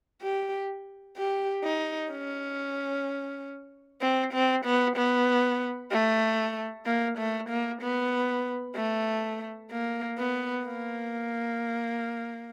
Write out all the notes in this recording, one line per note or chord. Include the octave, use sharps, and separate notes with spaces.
G4
G4
D#4
C#4
C4
C4
B3
B3
A3
A#3
A3
A#3
B3
A3
A#3
B3
A#3